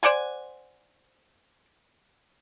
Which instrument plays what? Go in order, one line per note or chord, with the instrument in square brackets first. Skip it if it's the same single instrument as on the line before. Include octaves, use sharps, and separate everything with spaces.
[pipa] C5 D5 F#5 G#5